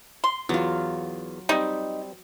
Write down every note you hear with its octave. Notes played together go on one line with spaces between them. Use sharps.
C6
E2 F#3 F4
G3 C4 D#4